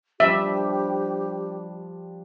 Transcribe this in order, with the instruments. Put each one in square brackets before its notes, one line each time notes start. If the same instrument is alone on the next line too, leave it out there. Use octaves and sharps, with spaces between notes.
[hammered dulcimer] F3 G3 D4 [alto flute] G4 [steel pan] E5